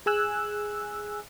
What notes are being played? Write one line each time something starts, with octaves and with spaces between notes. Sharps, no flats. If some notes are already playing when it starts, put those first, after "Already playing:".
G#4 G#5 E6 F#6